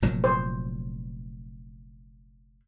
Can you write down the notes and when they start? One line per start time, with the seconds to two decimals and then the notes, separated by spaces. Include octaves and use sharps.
0.02 F1 A#2 F#3
0.24 C5